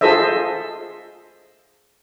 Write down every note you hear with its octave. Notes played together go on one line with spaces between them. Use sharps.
F4 G#4 A4 C5 D#5 E5